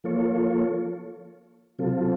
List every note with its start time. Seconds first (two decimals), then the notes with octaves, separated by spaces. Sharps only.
0.04 F3 A#3 F4 A4 C#5
1.79 C3 F#3 C4 F4 A4